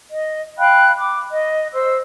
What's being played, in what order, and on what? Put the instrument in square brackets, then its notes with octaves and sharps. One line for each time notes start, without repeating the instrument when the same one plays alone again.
[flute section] D#5
F5 G5 B5 F#6
D6
D#5
C5 E6